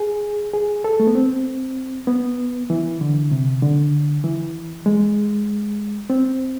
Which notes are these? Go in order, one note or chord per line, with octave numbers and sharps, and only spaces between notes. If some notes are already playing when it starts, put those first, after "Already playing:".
Already playing: G#4
G#4
A4
A3
B3
C4
B3
E3
D3
C3
D3
E3
G#3
C4